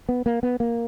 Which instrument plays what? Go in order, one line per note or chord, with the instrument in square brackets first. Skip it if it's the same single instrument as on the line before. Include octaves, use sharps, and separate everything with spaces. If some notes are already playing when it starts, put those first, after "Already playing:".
[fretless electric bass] B3
A#3
B3
A#3